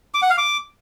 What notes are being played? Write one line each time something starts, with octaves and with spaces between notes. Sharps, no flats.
D6
F#5
F5
D6